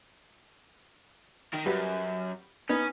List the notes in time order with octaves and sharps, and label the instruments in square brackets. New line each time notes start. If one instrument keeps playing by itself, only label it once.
[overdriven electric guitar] D#3 A#4
[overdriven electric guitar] F#2 [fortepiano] G3 F#4 B4
[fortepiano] B3 D#4 B4 [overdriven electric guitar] C#4